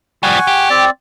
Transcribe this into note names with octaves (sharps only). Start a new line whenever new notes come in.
F3 G3 F#5 G#5 C#6
G4
C4 D5